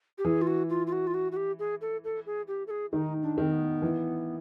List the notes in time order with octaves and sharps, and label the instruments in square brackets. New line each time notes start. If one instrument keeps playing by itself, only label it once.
[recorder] G4
[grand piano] E3 [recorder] G#4
[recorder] F4
F#4
F4
F4
F#4
F4
F#4
F#4
G4
G#4
A4
A4
G#4
G4
A4
G#4
[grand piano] D#3 [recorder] D#4
[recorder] D4
[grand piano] D#3 [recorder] C4
[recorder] B3
[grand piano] E3